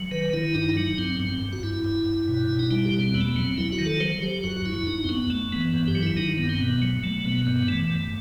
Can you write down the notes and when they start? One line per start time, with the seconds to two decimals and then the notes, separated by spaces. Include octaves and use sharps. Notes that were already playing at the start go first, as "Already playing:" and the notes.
Already playing: F#3
0.11 D#3 B4
0.33 D#3 E4
0.55 G2 D#4
0.69 E4
0.76 F#3 D#4
0.98 G2 C4
1.20 G2 C4
1.41 G2
1.53 F#4
1.63 G2 E4
1.84 G2
2.06 G2
2.28 B2
2.49 B2
2.59 D#4
2.71 G3 E4
2.85 G4
2.93 B2
3.00 C4
3.14 E2 B3
3.21 A3
3.28 B3
3.36 F#3 C4
3.58 F#3 E4
3.72 F#4
3.79 D#3
3.86 A4
4.00 F#3 C5
4.22 F#3 G4
4.43 F#2 F#4
4.57 F#4
4.66 F#2 E4
4.87 F#2 D#4
5.04 C4
5.09 F#2 B3
5.30 F#2 A3
5.52 E3 B3
5.73 G2 B3
5.88 G4
5.95 F#3
6.03 E4
6.17 D#3 D#4
6.38 G2 B3
6.49 C4
6.60 B2 B3
6.82 F#3
7.03 F#3 A3
7.25 B2 B3
7.46 G2 B3
7.68 E3 A3
7.90 G2